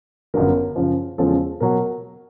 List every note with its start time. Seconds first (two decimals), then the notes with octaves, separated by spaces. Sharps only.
0.34 G1 F#2 D3 F#3 B3 A#4
0.76 F#2 C#3 F3
1.18 E2 C#3 F3 G#3 C#4 A4
1.60 B2 F#3 A#4